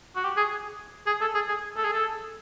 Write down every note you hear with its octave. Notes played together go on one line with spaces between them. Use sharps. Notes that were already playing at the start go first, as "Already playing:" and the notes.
F#4
G4
G#4
G#4
A4
G#4
G#4
A4
G#4
A4